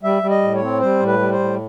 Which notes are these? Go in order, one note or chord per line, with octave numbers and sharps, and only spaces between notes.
G3 E5
G3
D#5
A2
C#5
C4
G3 C5
A2
B4
G3
C5
A2